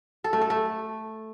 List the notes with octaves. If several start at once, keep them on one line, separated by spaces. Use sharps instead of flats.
A4
A3
A4
A3